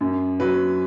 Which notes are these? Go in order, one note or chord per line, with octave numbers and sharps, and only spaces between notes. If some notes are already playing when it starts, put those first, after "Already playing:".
F#2
F#3 B4